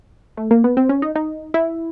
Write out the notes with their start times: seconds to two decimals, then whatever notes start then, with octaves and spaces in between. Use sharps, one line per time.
0.37 A3
0.51 A#3
0.64 B3
0.77 C4
0.89 C#4
1.02 D#4
1.16 D#4
1.54 E4